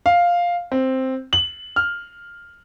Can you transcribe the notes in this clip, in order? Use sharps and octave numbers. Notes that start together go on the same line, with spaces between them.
F5
C4
F#7
F6